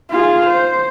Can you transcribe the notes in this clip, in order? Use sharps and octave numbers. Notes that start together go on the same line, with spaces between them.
F4 G#4
C5